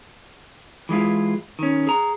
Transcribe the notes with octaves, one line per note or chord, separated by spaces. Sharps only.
E3 G#3 E4 F4
D#3 C#4
G#4 A#5